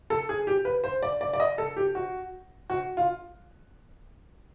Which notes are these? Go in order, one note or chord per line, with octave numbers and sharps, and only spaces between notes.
A4
G#4
G4
B4
C5
D5
D5
D5
D#5
A4
G4
F#4
F#4
F4